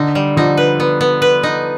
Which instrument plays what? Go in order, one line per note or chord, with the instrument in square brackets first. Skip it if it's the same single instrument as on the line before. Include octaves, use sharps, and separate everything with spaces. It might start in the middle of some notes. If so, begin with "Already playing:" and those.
Already playing: [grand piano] D3 [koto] D#4
[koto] G3
[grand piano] D3 F3 [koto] D#4
[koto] B4
B3
B3
B4
D#4